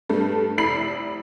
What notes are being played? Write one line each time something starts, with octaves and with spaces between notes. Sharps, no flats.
G2 A3 B3
F1 E4 B5 C7 F#7